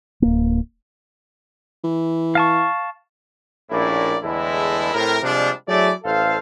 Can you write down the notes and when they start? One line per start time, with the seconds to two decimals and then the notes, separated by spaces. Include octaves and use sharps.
0.22 D1 A#3
1.84 E3
2.35 F5 A5 C#6
3.70 A#1 A2 A#3 C#4 E4 D5
4.22 E2 A2 D3 G#3 E4
4.93 A2 C3 A#4
5.22 C3 F3 G3 G#3 D4
5.68 F#3 A3 E4 G#4 D5
6.04 A1 A4 C5 F5